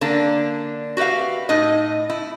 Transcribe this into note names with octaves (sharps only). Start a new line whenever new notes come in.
D3 A#3 D4
F#4 G4 B4 E5 F5
A2 D#4 D#5
E4